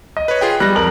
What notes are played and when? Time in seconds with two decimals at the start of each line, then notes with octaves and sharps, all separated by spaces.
0.17 D#5
0.28 B4 C#5
0.41 F4 G#4 G5
0.60 G3 F#6 A#6
0.75 F2 A#4 F#7